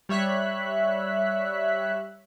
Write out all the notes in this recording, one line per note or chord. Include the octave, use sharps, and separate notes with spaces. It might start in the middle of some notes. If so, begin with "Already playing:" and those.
G3 C#5 E5 F#6 B6